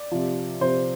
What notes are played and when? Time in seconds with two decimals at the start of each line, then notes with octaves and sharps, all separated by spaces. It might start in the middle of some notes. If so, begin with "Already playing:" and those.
Already playing: D5
0.11 C3 F3
0.61 C3 F3 C5